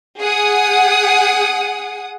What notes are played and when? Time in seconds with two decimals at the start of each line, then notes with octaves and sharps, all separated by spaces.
0.20 G#4 F#5 D#6